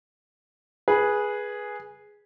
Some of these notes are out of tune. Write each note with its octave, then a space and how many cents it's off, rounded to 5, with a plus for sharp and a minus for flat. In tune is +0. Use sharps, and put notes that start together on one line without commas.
G#4 +0 B4 -15